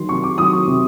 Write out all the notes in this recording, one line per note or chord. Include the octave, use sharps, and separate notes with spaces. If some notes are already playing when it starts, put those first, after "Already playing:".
Already playing: D#3 F#3 C6
C3 C#6
D6
D#3 F#3 D#6
C#6
C3